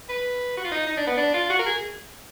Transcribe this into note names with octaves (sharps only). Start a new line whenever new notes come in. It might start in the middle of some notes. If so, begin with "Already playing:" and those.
B4
F#4
F4
D#4
D#4
D4
B3
D4
F4
F#4
A#4
G#4